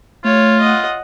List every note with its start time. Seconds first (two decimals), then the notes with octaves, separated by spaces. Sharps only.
0.24 A3 F4 C#5
0.60 D#5 F#5